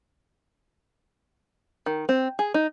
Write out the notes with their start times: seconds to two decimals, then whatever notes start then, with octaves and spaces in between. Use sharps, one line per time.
1.86 D#3
2.09 C4
2.39 G#4
2.54 D#4